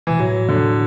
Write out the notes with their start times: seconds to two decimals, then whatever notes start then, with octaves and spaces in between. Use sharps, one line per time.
0.07 B2 E3
0.19 A2 F#3
0.49 D3